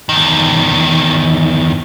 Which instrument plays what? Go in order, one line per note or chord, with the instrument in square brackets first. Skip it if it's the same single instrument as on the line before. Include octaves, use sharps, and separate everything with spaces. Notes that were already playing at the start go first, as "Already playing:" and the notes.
[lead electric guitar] E2 D#3